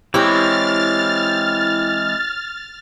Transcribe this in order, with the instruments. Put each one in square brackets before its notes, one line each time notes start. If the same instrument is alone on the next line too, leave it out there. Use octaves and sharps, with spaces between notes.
[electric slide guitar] E3 G#3 C4 [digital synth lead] E4 [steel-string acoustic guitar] G4 C#5 [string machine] F6 A6